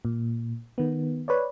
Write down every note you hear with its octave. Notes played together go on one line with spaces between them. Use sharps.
A#2
D#3 B3
B4 C#5 D5